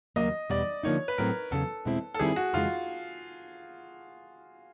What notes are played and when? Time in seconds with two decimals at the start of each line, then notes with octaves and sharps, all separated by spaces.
0.16 D#2 C#3 F#3 A#3 D#5
0.50 E2 B2 G3 D5
0.83 D3 F3 A#3 D#4 C#5
1.08 B4
1.18 A2 F#3 A3 C4 A#4
1.51 E2 C#3 F#3 A4
1.85 E2 B2 G#3 C4 E4
2.14 A4
2.19 G2 D#3 G3 C4 E4 G#4
2.36 F#4
2.53 F2 C#3 E3 G#3 F4